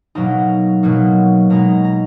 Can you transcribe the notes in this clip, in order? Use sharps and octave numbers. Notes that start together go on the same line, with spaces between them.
B2 F#3 A#3 D#4 A#5
B2 F#3 A#3 D#4
B2 G#3 D#4 A#5
A#5